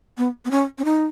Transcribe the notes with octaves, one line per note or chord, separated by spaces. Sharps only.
B3
B3
C#4
C#4
D#4